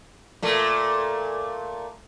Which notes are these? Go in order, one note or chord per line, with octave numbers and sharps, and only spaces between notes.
A#2 A3